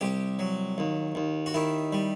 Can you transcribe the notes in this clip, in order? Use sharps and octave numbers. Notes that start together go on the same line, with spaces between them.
C2 G4
F#3
D#2
D#2
F#4
D#3 E4
G3